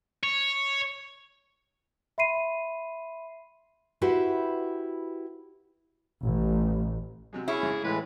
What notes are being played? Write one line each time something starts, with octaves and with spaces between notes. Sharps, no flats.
C#5
E5 B5 C6 C7 D#7
E4 F#4 G4 B4 C5 E5
A1
C3 F#3 G#3
C#4 E4 G#4 C#5 E5
G#2 C#3
A2 E3 G#3 B4